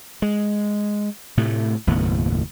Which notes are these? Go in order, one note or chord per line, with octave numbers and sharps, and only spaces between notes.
G#3
A2 C3 A3
F#1 D#2 A2 B3